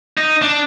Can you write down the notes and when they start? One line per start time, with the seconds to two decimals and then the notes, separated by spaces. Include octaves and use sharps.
0.17 D#4
0.42 D4